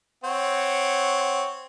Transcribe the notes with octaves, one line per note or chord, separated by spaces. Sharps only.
C4 C#5 F#5